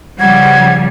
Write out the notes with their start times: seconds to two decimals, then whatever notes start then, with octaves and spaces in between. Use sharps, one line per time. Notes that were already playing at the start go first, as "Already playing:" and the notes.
0.20 C#3 F3 G3 F#5 G#6